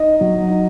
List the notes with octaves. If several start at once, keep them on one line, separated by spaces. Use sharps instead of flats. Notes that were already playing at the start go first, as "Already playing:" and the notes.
Already playing: D#4 D#5
F#3
D#4